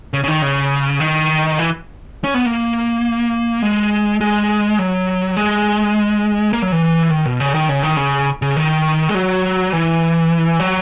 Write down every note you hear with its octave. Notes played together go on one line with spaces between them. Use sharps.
C#3
C#3
D#3
C#3
D#3
E3
C#4
B3
A#3
G#3
G#3
F#3
G#3
A#3
F#3
E3
D#3
B2
C#3
D#3
C#3
D#3
C#3
C#3
D#3
G#3
F#3
E3
F#3